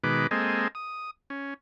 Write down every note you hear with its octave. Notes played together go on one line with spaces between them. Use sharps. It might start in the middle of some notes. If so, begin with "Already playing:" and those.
B2 D#3 G#3 B4 D6
G#3 A#3 C4 A4 D#5 G#5
D#6
C#4